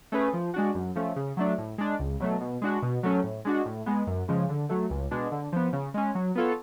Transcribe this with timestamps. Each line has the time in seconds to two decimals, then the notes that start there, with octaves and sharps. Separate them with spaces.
0.12 A3 C#4 G#4 B4
0.33 F3
0.54 G#3 D4 F#4
0.75 F#2
0.95 F3 A3 C#4
1.16 C#3
1.37 F#3 A3 D4
1.58 A2
1.78 G#3 D4
1.99 C#2
2.20 B2 F#3 A3
2.41 B2
2.62 G#3 D4 F#4
2.82 B2
3.03 F#3 A3 C#4
3.23 A2
3.45 G#3 D4 F#4
3.65 A2
3.86 G#3 B3
4.07 F#2
4.28 C#3 F3 G#3
4.49 D3
4.69 F#3 A3
4.90 C#2
5.11 B2 G#3 D4
5.32 D3
5.52 F3 B3
5.73 C#3
5.94 G#3 C#4
6.15 F#3
6.35 B3 F4 A4 C#5